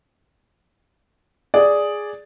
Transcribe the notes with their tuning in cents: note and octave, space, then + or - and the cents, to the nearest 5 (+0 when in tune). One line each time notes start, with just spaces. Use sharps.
G#4 +0 D5 +0